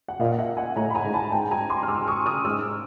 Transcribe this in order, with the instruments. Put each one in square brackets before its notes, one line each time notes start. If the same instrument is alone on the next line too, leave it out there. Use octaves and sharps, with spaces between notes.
[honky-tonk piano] F#5
[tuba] A#2 [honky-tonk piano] D#5 F5
[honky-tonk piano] F5
E5 F#5
F#5 G#5
[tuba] A2 [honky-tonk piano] G#5 A#5
[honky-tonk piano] B5
G#5 A#5
[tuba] G#2
[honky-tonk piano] A5 B5
[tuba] G#2 [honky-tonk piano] G5 A5
[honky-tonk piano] G#5 A#5
C6 D6
F6
[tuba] G#2 [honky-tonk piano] D6 E6
[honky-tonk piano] C#6 D#6
D#6 F6
[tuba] G#2 [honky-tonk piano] D6 E6